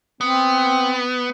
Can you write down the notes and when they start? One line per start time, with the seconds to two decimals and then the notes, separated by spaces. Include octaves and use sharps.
0.21 B3 C4